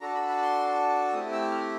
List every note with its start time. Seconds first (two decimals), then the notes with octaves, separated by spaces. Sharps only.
0.01 D4 F#4 A4 A#5
0.14 B5
0.29 B5
0.43 C6
1.13 A3 C4 E4 G4 D#6
1.32 E6
1.51 F6